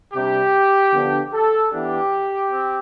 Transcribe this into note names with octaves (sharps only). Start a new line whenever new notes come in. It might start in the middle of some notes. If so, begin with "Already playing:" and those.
C3 G3 D4 G4
D3 F3 B3 D4
A4
E3 B3 D4 G4
C4